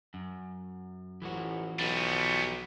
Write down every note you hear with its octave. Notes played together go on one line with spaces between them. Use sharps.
F#2
A1 E3 F3 F#4
B1 G3 B3